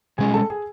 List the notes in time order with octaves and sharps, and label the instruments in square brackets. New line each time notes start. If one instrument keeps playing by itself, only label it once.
[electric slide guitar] B2 G#3 C#4 [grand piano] G#4 G#5
[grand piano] A4 A5
G#4 G#5